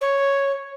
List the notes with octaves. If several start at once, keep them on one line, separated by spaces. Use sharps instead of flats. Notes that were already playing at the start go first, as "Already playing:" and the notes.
C#5